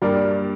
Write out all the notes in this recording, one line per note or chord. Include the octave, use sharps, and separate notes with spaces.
G2 G3 A#3 A#4 D5